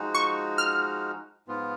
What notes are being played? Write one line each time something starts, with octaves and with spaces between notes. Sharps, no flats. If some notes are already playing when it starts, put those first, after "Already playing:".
Already playing: F3 G#3 D#4 F#4
C#6
F6
G#2 F3 B3 F4